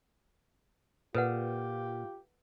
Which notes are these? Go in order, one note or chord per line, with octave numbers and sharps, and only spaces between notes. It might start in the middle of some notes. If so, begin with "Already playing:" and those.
A#2 F4 G4 A4 B4 F#5